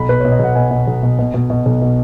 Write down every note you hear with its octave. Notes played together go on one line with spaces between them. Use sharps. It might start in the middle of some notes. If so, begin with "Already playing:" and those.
Already playing: B1 B5
B2 B4
B2 C#5
D#5
B1 F#5
B2 G#5
B2
B1
B2
B2
B2
B2
B1
B2